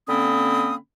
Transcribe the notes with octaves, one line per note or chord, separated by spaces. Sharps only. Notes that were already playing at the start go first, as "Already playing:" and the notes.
D3 A#3 C4 C#4 B5 D#6